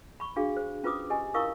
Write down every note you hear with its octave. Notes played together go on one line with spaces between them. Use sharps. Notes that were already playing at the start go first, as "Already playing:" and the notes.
B5 C#6
D4 F#4 G#4 F5
C5
C#4 F4 B4 C5 D6 D#6
G4 D#5 G#5
E4 A#4 F5 C#6 D#6 E6